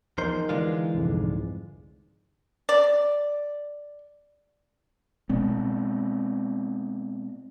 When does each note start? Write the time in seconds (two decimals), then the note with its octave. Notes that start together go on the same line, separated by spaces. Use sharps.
0.18 E2 F3 D#4 A#4 C5
0.49 D3 E3 G#3 F4
0.94 C2 F2 G#2
2.69 D5
5.29 B2 G#3 C4